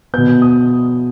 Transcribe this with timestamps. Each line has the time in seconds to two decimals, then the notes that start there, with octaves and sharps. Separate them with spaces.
0.14 B2 B3 G6
0.42 D#6